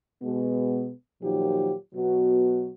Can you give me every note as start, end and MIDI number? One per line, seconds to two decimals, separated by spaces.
0.23 0.91 47
0.23 0.91 56
0.23 0.91 59
1.22 1.73 46
1.22 1.73 51
1.22 1.73 53
1.22 1.73 54
1.22 1.73 63
1.22 1.73 67
1.94 2.69 47
1.94 2.69 54
1.94 2.69 59
1.94 2.69 66